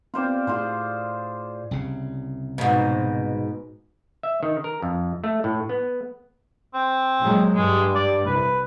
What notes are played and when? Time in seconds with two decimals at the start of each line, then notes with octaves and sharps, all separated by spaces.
0.14 B3 C4 F4 C5 D5
0.47 A2 F4 G#4 C5
1.71 C2 C#3
2.58 G#2 B2
4.23 E5
4.43 D#3
4.64 A#4
4.82 F2
5.24 A3
5.44 A2
5.69 B3
6.74 C4
7.20 A#2 F#3 G#3
7.55 G2 G#3
7.95 D5
8.26 C2 B4